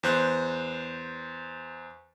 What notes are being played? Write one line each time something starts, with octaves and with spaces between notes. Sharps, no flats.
E2 C5 F#6